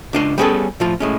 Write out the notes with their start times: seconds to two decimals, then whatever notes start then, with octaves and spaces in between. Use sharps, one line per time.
0.13 C#2 D4 F5
0.38 G3 B3 C#4 F#4 G#4 A4
0.80 A2 F3 F4
1.00 A2 G#3 C#4